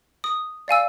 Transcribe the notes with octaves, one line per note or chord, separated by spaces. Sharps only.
D#6
D5 F5 G#5 E6